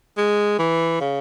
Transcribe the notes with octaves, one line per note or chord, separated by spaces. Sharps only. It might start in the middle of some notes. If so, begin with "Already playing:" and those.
G#3
E3
C#3